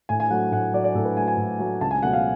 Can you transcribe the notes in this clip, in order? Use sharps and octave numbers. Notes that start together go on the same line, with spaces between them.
A2 G#5
G#5
F#3 A3 F#5
A2 F#5
F#3 A3 D5
D5
A2 A4
B4
F#3 A3 G#5
G#5
A2
F#3 A3
C#2 A5
G#5
B2 F#3 A3 F#5
F5